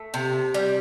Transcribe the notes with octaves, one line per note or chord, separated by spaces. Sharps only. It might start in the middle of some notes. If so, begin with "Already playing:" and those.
Already playing: A3
C3
G3